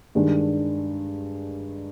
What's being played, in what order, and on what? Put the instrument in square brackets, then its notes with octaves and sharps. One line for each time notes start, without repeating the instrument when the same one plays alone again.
[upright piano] G2 D#3 G#3 D4